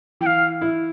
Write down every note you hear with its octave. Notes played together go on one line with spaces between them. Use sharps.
E3 G5
F5
E4